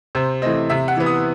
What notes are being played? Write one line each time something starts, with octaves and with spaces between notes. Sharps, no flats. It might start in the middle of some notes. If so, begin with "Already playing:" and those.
C3 C5
E3 A3 C4 D#5
C3 E5
F#5
E3 B3
D#6